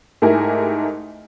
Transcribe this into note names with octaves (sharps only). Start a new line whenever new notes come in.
G#2 A3 E4 G4 A#4 G#5